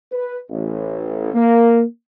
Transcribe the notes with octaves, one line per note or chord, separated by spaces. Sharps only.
B4
A1
A#3